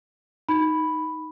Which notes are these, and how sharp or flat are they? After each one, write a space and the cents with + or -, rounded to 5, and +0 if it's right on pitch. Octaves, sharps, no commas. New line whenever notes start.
D#4 +0 B5 +0